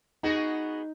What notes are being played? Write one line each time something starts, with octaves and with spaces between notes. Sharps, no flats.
B3 D#4 F#4 G#4